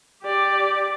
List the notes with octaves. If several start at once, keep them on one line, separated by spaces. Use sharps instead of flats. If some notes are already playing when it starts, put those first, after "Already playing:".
G4 D5